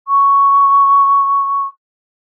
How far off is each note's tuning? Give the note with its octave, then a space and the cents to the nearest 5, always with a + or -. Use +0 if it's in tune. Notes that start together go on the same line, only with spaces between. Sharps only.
C#6 +5